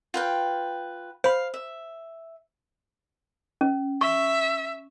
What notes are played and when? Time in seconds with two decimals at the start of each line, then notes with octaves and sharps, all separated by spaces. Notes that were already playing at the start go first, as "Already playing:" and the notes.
0.14 F4 B4 G5
1.24 C5 F5 B5
1.54 E5
3.61 C#4
4.01 E5 C#6